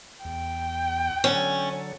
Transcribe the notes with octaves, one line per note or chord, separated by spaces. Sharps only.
E2 G5
D3 F#3 C#4 A4